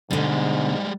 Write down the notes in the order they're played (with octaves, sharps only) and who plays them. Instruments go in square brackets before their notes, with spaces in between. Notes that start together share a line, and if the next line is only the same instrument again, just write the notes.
[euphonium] G#2 [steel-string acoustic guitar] B2 D3 [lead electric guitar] G3 G#3